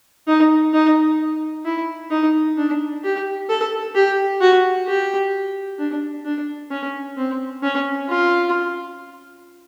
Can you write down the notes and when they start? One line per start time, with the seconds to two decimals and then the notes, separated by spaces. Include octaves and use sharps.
0.28 D#4
0.74 D#4
1.65 E4
2.11 D#4
2.57 D4
3.04 G4
3.49 A4
3.95 G4
4.41 F#4
4.88 G4
5.79 D4
6.25 D4
6.70 C#4
7.17 C4
7.63 C#4
8.09 F4